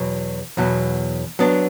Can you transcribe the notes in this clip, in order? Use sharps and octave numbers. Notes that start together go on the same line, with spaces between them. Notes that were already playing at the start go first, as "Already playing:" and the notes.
Already playing: E2 B2 F#3
E2 B2 F#3
F#3 B3 D4